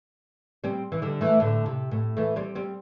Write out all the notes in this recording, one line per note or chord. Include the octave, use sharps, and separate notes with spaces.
G3 C4
E3
D3 G3
E3 A3
A2 D3
C3
A2
E3 A3
G3 C4
G3 C4